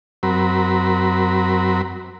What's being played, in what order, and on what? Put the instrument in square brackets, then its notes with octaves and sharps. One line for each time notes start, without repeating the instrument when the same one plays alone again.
[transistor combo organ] F#2 F#3 C4 A#4 B5